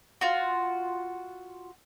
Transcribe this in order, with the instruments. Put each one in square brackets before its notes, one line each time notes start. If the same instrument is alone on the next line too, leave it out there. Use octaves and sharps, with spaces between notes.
[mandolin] F4 F#4